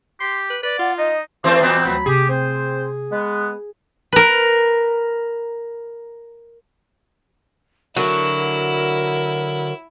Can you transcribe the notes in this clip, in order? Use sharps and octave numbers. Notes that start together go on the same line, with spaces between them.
G4 C6
B4
B4 D5
F4 F#5
D#4 D#5
D#2 E3 A3 C4 C5 D5
E2 B2 E3 G3 B3 C4
D2 F#3 B5
C3 A3 G4 G#4
C4 C5
G#3 B3
A#4 B4
D3 F#3 E4 A4 A#4